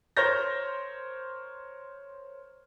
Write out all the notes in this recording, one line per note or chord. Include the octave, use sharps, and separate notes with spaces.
A#4 C5 C#5 F6 G6 A#6